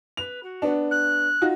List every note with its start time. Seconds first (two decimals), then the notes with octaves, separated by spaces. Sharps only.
0.17 B4 F7
0.43 F#4
0.62 B3 D4
0.90 F#6
1.42 D#4 F4 F#4